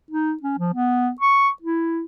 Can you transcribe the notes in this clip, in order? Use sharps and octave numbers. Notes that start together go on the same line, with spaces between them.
D#4
C#4
F3
B3
C#6
E4